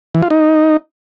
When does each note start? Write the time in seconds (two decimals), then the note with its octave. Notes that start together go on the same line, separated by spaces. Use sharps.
0.15 E3
0.22 F4
0.30 D#4